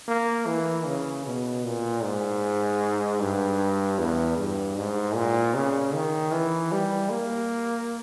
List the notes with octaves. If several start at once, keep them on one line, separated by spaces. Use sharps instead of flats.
A#3
E3
C#3
B2
A#2
G#2
G2
E2
G2
G#2
A#2
C#3
D#3
E3
G3
A#3